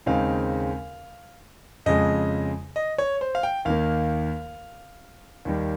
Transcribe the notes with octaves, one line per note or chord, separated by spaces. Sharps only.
D#2 C#3 G#3 C4 D#4 F5
F2 C#3 G#3 D#5
D#5
C#5
C5
F5
G5
D#2 D#3 A#3 F5
D#2 D#3 G3